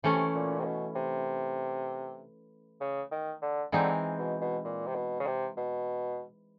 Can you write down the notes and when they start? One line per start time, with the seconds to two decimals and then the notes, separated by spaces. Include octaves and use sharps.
0.03 C3 E3 A3 C#4
0.35 A#2
0.60 C3
0.65 B2
0.95 C3
2.81 C#3
3.12 D#3
3.42 D3
3.72 D3 E3 G#3 C4 D#4
4.19 B2
4.41 B2
4.65 A#2
4.87 C3
4.95 B2
5.20 C#3
5.27 C3
5.57 B2